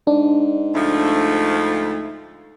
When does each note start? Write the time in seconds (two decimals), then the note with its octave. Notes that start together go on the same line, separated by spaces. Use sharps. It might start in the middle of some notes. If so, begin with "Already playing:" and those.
0.07 G#2 D4
0.75 D2 F3 A3